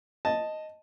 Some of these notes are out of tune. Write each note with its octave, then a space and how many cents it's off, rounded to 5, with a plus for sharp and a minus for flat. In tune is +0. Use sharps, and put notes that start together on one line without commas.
D#5 +0 A5 +0